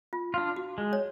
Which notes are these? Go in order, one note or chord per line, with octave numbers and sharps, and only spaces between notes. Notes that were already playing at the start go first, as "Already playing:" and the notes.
F4
D4 F4
F#4
G#3
C#5